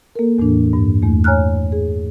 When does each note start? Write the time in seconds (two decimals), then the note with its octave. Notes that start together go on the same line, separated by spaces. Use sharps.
0.16 A#3 A4 A#4
0.38 E2 A2 E3 D4
0.73 G2
1.03 E2 A3
1.24 C#5 G#5 A#5 F6 F#6
1.72 G#4